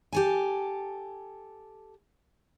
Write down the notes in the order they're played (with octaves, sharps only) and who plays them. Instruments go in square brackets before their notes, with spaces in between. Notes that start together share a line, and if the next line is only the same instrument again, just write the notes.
[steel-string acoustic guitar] G4 A4 G#5